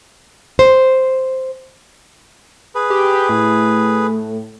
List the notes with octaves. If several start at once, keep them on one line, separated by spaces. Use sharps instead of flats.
C5
G#4 B4
G4
A2